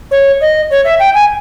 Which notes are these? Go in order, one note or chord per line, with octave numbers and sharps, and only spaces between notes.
C#5
D#5
C#5
E5
G5
G#5